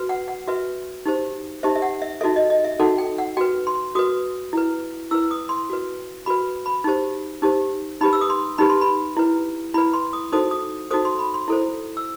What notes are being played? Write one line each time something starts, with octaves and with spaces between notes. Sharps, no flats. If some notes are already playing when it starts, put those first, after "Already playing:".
Already playing: F#4 B4
F#5
F#5
F#4 B4 E5
D#4 G4 C5
D#4 G4 C5 E5
E5
F#5
E5
D#4 F#4 A4 E5
D#5
D#5
E5
D#4 F#4 A4 F#5
G5
F#5
F#4 B4 G5
C6
F#4 B4 D#6
E4 B4
E4 B4 E6
D#6
C6
F#4 B4
F#4 B4 B5
B5
D#4 G4 C5
D#4 G4 C5
D#4 G4 B4 B5
E6
D#6
C6
D#4 G4 B4 B5
C6
B5
E4 B4
E4 B4 B5
C6
D#6
D#4 F#4 A4 C5 D#6
D#6
D#4 F#4 A4 C5 D#6
C6
B5
C6
E4 A4 C5
E6